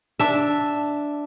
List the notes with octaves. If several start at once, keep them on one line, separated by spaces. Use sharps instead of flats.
D4 E5